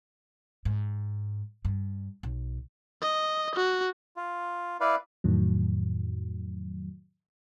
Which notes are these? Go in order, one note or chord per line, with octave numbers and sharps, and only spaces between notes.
G#2
G2
B1
D#5
F#4
F4
E4 B4 D5 F5
F2 A2 D#3 F#3